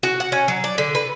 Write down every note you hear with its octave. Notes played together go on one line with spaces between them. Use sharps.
F#4
F#5
C#4
F#3
D5
D3
B4